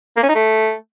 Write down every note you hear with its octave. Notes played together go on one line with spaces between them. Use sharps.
A#3
C#4
D#4
A3